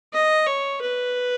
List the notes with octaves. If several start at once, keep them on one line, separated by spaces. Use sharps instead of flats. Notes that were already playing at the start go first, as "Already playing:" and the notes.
D#5
C#5
B4